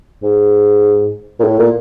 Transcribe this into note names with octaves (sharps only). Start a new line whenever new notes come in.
G#2
A#2
A2
A#2